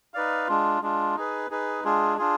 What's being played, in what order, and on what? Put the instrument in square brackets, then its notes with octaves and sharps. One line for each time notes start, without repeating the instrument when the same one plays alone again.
[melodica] D#4 B4 D5 F5
G#3 D4 F4
G#3 D4 F4
D#4 G#4 B4
D#4 G#4 B4
G#3 D4 F4 G#4
D4 F4 G#4